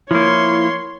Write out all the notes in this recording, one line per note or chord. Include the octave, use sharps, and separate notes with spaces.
F3 A#3 E4 C#5 C6